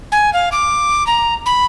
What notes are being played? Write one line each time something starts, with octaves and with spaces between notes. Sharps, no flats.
G#5
F5
D6
A#5
B5